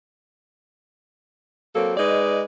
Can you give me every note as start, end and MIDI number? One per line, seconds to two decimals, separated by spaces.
1.75 1.93 54
1.75 1.93 58
1.75 1.93 60
1.75 1.93 69
1.97 2.42 56
1.97 2.42 63
1.97 2.42 71
1.97 2.42 74